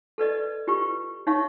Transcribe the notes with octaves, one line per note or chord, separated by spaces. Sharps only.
A4 B4 D5 D#5
F4 G4 B4 C#6
D#4 C#5 E5 F5 C#6